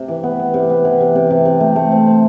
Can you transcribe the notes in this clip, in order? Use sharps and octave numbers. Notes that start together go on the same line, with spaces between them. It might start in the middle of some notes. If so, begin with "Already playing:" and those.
Already playing: C3
E3
B3
B3
C3
B3
E3
C3
C3
C3
C3
A3
A3
C4
C4